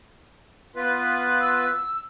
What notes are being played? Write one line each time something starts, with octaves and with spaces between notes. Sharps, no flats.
B3 F4 B4
E6